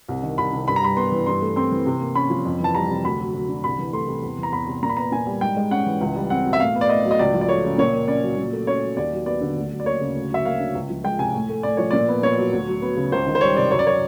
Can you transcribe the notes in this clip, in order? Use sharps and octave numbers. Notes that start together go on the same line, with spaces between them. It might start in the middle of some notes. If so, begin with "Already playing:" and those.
C2
D#3
C2 B5
C3
G2 B5
A#5
G3 B5
B3 C6
E3
G2 C6
A3
C4 C6
E3
C3
A#3
C#4 B5
F3
F2
E3 A5
G3 A#5
C3
D2 B5
F#3
D2
D3
C2 B5
E3
A3 C6
C3
E2
E3
A#5
E2 B5
C3
A#2 A#5
B5
B3 A#5
A#2 G#5
G3
G#2 G5
G#3
C#4 F#5
E3
C#2
G3
C4 F#5
B2
E5
A2 F5
B3
D5
A2 D#5
F#3
D#5
C#2 D5
F3
D5
A3 C#5
C#3
A#2 C#5
A#3
C#4 D5
F#3
A#2
A3
C#4 C#5
F#3
D#2 D5
F#3
B3 D5
D3
D2
F#3
D5
A#3 C#5
C#3
D2
F#3 E5
A#3 F5
D3
C#2
F3
G#3 G5
C3 G#5
A2
A3
A2 D5
F3 C#5
A#2 D5
B3
A#2 C#5
F#3
D2
F#3
B3
C#3
C#2 C5
D#3
C5
G3 C#5
C3 D5
F#2 C#5
D5
F#3 C#5